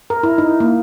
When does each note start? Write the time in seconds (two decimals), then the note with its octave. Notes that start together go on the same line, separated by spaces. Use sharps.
0.10 A#4
0.23 E4
0.38 D#4
0.60 A#3